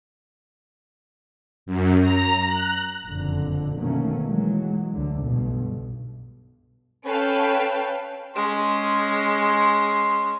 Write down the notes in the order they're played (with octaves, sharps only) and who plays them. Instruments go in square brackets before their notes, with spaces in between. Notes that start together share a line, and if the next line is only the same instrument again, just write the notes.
[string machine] F#2
A#5
F#6
[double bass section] F#1 F2 A#2 D3
B2 D#3 F#3 A3 A#3 C#4
E3 F#3 G#3
D2 D3
B1 G2 B2
[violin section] C#4 A4 B4 F5 G5 A5
[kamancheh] G#3 C#4 [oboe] C6